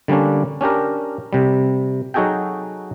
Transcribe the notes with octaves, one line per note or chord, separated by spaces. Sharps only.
D3 G3 A#3 C#4 D4
C#4 D4 G4 A#4
C3 G3
F#3 D#4 F#4 G#4 A4 G5